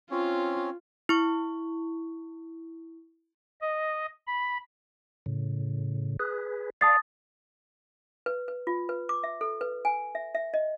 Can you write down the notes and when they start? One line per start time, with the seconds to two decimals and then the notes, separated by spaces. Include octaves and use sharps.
0.11 C4 C#4 F4 C#5
1.09 E4 C#6
3.61 D#5
4.27 B5
5.26 A2 C#3
6.20 G#4 B4
6.81 D5 F5 A5 D#6 A6
8.26 B4
8.48 B4
8.67 F4
8.89 B4
9.09 D6
9.24 E5
9.41 A4
9.61 B4
9.85 G#5
10.15 E5
10.35 E5
10.54 D#5